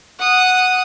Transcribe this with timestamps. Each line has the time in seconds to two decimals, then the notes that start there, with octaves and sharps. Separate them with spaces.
0.19 F#5 D#6